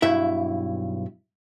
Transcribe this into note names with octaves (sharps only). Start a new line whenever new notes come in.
B1 G2 E4 E5